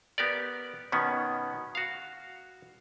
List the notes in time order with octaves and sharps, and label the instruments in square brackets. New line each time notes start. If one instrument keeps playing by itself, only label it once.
[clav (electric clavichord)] B3 G4 A#4 D5
B2 D#3 B3 C#4
F#4 F5